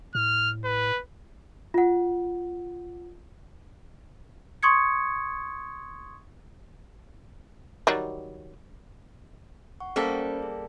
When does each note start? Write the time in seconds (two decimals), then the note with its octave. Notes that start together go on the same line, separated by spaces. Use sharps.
0.15 A2 F6
0.64 B4
1.74 F4 F#5
4.63 C6 C#6 D#6 G#6 C#7
7.87 D#3 F#3 G3
9.80 F#5 C#6
9.96 G3 A#3 C#4 A4 C5 F5
10.43 G#4